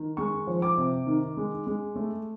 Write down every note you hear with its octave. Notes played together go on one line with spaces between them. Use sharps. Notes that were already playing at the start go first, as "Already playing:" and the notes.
Already playing: D#3
G#3 C#6
F3
D6
C3
D#3
G#3
G#3
A3